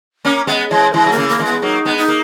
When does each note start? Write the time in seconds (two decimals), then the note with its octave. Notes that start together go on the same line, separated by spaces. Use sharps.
0.25 A#3 C#4
0.47 G#3 B3 E5
0.53 D#5
0.71 E3 G#3 C#5
0.93 E3 G#3 E4
1.06 F#3
1.11 A#3
1.16 C#3 E3
1.29 A#3
1.39 E3 G#3
1.45 B3
1.62 F#3 A#3 D#4
1.85 G#3 B3
1.98 D#4
2.08 A#3